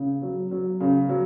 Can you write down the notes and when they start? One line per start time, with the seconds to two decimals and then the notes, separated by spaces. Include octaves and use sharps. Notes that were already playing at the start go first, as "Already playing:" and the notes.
Already playing: C#3
0.22 F#3
0.51 F#3
0.80 C#3
1.09 F#3